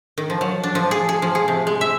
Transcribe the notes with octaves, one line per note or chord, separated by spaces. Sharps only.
D#3
F3
F#3
D4
F3
G#4
G#4
F3
G#4
C3
G#3
E5